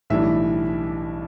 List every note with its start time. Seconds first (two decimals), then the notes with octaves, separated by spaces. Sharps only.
0.10 B1 A2 E3 G3 D4 E5